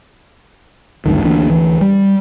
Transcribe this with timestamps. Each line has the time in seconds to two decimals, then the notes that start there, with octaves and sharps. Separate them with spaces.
1.06 G#1 D2 G2 D#3
1.24 D2 E3 A#3 D4
1.50 D2 E3
1.81 G3